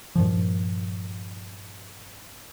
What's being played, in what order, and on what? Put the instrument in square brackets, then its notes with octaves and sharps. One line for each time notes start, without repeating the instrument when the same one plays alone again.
[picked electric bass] G2 A#2 F3